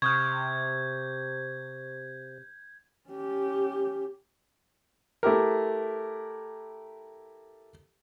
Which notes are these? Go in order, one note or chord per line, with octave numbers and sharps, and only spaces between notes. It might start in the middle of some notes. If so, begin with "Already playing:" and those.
C3 C#6 D#6 F6 G6 G#6
C#4 G4
A3 E4 G4 A#4